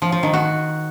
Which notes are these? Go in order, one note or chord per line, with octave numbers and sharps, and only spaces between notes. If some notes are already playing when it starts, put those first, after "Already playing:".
F3
F3
D#3
F#4